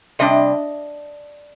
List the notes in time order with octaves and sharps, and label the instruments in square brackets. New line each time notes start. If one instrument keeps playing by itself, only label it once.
[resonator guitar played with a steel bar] C3 G3 D4 D#5